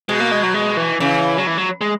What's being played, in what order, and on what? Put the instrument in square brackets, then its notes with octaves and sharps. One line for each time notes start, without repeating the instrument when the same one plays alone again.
[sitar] B2 [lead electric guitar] G#3
[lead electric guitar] A#3
G#3
F#3
G#3
E3
[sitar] C#3 [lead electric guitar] E3
[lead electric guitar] F#3
E3
F#3
G#3